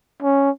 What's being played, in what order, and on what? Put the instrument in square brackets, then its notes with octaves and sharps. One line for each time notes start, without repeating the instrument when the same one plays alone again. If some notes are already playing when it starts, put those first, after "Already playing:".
[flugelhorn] C#4